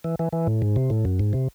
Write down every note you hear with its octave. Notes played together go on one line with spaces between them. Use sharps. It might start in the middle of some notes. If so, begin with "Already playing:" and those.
E3
E3
E3
A2
G#2
C3
A2
F#2
G#2
C3